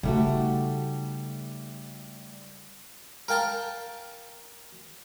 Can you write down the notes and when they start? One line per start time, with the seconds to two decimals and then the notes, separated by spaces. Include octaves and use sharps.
0.03 C#3 G3 A3 D#4 F#4
3.28 A#4 F5 G5 A5 A#5